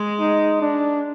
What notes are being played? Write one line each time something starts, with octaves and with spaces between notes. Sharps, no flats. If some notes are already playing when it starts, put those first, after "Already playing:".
Already playing: G#3
D#4
D4